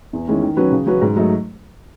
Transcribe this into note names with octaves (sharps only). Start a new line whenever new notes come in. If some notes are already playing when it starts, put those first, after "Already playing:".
E2
D#3 G#3 C#4 E4
D#3
F#3 C#4 F#4 B4
C#3
F#3 C#4 F#4 B4
G#2
F#3 A3 D#4